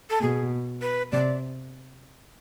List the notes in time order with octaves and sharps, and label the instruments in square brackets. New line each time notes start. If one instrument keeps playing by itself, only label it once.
[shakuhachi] A4
[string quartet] B2 [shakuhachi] G#4
[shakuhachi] B4
[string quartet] C3 [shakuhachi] D5